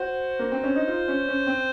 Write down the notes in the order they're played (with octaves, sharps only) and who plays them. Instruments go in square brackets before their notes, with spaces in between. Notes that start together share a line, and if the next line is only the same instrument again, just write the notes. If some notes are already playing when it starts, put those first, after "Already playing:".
Already playing: [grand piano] F#4 [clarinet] C5
[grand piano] A#3
C4
C#4
D#4
F4
C#4
C#4
C4